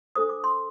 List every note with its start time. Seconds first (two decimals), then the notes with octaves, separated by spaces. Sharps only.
0.15 D4 A4 C5 D#6
0.29 D6
0.44 C6